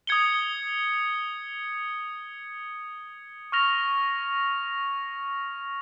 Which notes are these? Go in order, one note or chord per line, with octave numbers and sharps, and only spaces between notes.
D#6 G#6 C#7 G7
C#6 F6 A#6 F7